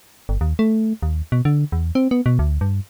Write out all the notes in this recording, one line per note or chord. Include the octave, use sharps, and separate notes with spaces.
G1
D#2
A3
D#2
B2
D3
E2
C4
B3
B2
D2
G2